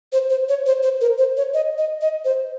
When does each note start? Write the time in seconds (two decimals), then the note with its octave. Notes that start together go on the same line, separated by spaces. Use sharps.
0.13 C5
0.30 C5
0.49 C#5
0.66 C5
0.83 C5
1.01 A#4
1.18 C5
1.37 C#5
1.54 D#5
1.78 D#5
2.01 D#5
2.25 C5